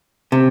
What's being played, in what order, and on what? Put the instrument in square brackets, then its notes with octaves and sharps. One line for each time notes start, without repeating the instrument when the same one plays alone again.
[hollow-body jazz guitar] C3